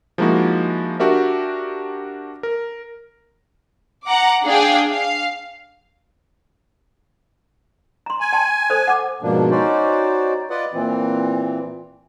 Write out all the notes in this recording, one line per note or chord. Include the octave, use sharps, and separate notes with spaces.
F3 G#3 A#3 D#4 E4 F#4
D4 F#4 G4 A#4 E5
A#4
F#5 A#5 D6
D4 G#4 F5 G5
F5
A#5 C6
G#5
G5 A5 C6
A4 C5 D#6
F#5 D6
G#2 B2 F3 A#3 D4
C#4 D#4 F#4 C5 D5
F4 B4 D5 D#5 F#5
A#2 E3 C4